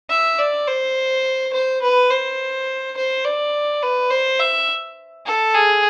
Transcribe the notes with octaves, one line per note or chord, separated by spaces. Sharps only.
E5
D5
C5
C5
B4
C5
C5
D5
B4
C5
E5
A4
G#4